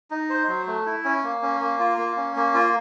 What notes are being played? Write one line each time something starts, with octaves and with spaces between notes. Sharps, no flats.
D#4
C5
F#3
A3
E4
C#4
A#3
C#4
A#3
F4
A#3
C#4
A#3
F4